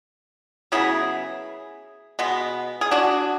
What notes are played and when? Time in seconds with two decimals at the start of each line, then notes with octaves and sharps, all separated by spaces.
0.72 C#3 F#3 B3 E4 G#4
2.19 B2 G#3 B3
2.81 G#4
2.91 D4 F#4